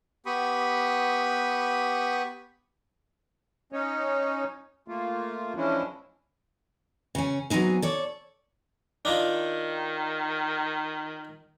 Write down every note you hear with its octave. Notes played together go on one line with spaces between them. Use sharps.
B3 G4 B5 C#6 D#6
C#4 D#4 C#5
A3 A#3 F4
E3 F3 G#3 C#4 D4 E4
C#3 C#4
F#3 B3 C4 D#4 G#4
A4 C#5 D5
D#3 D4 D#4 F4